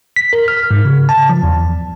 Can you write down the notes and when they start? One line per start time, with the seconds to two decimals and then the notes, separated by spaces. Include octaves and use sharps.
0.16 B6
0.33 A#4
0.48 F6
0.71 G#2
0.85 C#3
1.09 A5
1.29 F3
1.43 E2